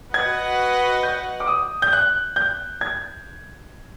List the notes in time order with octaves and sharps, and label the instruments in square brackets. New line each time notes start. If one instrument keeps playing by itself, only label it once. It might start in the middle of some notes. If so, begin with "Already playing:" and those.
[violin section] F#4 B4 D#5 F#5 [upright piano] G#6
[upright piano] G6
D6
D#6
G6
F#6
G6
G#6